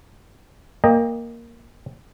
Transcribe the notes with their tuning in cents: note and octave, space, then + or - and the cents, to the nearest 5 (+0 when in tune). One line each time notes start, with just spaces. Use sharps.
A#3 +0 D#5 +0 G5 +35